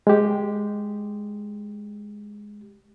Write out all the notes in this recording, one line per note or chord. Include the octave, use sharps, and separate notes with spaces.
G#3 G4